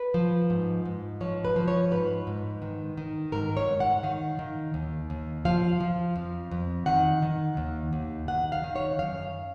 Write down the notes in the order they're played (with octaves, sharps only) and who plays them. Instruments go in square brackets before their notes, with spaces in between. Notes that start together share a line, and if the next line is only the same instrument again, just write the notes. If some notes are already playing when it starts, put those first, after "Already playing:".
Already playing: [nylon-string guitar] B4
F3
G#2
G#2
F3 C#5
B4
F3
C#5
G#2 B4
G#2
D#3
D#3
G#2 A#4
C#5
G#2
F#5
D#3 F5
D#3
D#2
D#2
F3 F5
F3
F2
F2
D#3 F#5
D#3
D#2
D#2
D#3 F#5
F5
D#3
C#5
F#2 F5